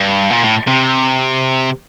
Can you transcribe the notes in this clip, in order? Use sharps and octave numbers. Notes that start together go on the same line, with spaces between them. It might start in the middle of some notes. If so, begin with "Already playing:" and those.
Already playing: G2
A#2
A2
C3